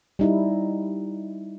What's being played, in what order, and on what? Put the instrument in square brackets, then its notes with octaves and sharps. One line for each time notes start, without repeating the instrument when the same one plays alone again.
[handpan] G3 D#4 E4